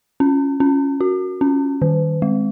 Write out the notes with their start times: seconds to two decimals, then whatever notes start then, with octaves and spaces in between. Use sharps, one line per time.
0.20 C#4
0.60 C#4
1.01 F#4
1.41 C#4
1.82 D#3
2.22 G#3